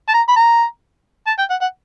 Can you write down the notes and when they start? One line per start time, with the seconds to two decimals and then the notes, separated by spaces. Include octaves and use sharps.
0.08 A5
0.14 A#5
0.29 B5
0.36 A#5
1.27 A5
1.39 G5
1.50 F#5
1.61 F#5